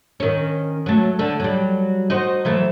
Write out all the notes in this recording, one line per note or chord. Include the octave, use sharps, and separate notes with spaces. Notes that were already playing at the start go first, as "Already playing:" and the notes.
D#3 C#4
F#3 A3
D3 A3
F#3 G3
D#4 F#4 C5
E3 F#3 A3